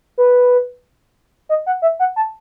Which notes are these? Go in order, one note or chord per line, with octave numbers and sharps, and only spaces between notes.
B4
D#5
F#5
E5
F#5
A5